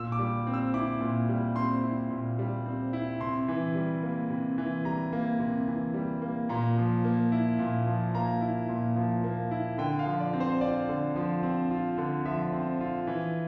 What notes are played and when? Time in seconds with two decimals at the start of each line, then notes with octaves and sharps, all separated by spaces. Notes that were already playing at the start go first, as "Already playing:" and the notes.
Already playing: A#2 E6
0.12 D6
0.19 G3
0.47 C4
0.54 E6
0.74 E4 D6
1.01 A#2
1.29 G3
1.56 C4 C6
1.83 E4
2.10 A#2
2.39 G3
2.66 C4
2.93 E4
3.20 C3 C6
3.48 E3
3.75 G3
4.03 A#3
4.30 C3
4.58 E3
4.85 G3 A#5
5.13 A#3
5.40 C3
5.68 E3
5.94 G3
6.22 A#3
6.49 A#2 A#5
6.78 F3
7.04 A#3
7.32 E4
7.59 A#2
7.87 F3
8.15 A#3 A#5
8.41 E4
8.69 A#2
8.96 F3
9.24 A#3
9.51 E4
9.78 D3 G5
9.99 F5
10.06 F3
10.20 D5
10.33 C4
10.40 C5
10.61 F4 D5
10.89 D3
11.16 F3
11.43 C4
11.71 F4
11.98 D3
12.25 F3 E5
12.53 C4
12.81 F4
13.07 E3